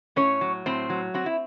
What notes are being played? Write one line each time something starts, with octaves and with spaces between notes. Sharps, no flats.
A2 C#4 C#5
F#3
A2 C4 C5
F#3
C4 F#4
E4